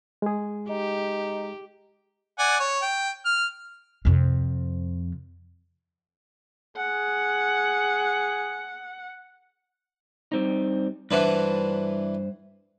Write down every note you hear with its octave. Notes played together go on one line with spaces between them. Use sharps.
G#3 G#4
D#4 G4
D5 F#5 G#5
C#5
G5
F6
F2 C3
G#4 F#5
G3 C4 D#4
G2 E3 D4 B4 C5 F#5